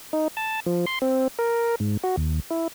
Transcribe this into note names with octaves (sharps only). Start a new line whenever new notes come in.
D#4
A5
F3
C6
C4
A#4
G#2
F#4
D#2
E4